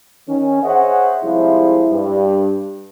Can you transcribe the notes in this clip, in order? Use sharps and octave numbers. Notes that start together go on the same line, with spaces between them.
D#3 C#4
G#4 C5 C#5 D#5 E5 F#5
C3 F3 G3 G#3 E4
G2